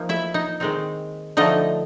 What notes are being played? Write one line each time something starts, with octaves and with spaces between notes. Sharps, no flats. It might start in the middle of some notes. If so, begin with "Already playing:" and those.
Already playing: F3 A#3 D#4
E4 E5
D#4 D#5
D#3 G#3 C4 D#4
D3 F3 A3 D#4 D#5